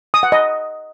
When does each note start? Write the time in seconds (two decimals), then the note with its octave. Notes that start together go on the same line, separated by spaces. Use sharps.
0.14 D#6
0.23 F#5
0.32 D#5